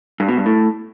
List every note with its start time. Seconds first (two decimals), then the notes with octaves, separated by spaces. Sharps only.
0.20 G2
0.29 B2
0.37 G2
0.46 A2